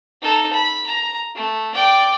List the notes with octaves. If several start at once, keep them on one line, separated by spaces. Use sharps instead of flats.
D#4 A4
B5
A#5
A3
D5 G5